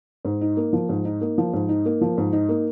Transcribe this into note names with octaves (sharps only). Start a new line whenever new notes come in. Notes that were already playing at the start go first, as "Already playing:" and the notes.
G#2
D#4
A#3
F3
G#2
D#4
A#3
F3
G#2
D#4
A#3
F3
G#2
D#4
A#3